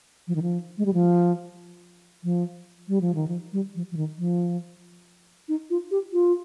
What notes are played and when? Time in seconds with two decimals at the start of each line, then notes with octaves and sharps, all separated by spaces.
0.28 F3
0.35 D#3
0.42 F3
0.78 G#3
0.86 G3
0.94 F3
2.24 F3
2.88 G3
3.01 F3
3.15 D#3
3.28 F3
3.53 G3
3.75 F3
3.92 F3
3.97 D#3
4.18 F3
5.49 D#4
5.70 F4
5.91 G4
6.13 F4